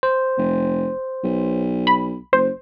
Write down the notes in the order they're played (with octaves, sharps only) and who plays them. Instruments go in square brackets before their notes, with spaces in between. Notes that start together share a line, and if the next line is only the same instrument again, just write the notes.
[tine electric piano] C5
[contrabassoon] F1
B1
[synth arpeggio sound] B5
[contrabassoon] F#1 [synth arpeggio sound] C5